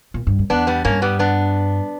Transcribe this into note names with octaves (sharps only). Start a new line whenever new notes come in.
A#2
G2
F#2
E2 B3 D4
G3 B3
G2 A#3 C#4
G3 B3
B3 D4